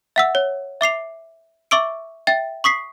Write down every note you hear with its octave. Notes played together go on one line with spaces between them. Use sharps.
E5 F#5 E6
C#5
E5 D6 C7 F7
E5 C#6 D6 E6 D7
E5 G5 A6
C#6 D#6 B6 C7